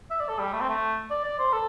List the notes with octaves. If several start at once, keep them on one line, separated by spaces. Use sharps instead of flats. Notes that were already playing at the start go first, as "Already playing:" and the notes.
E5
D5
A4
G3
A3
C4
A3
D5
D5
C5
A4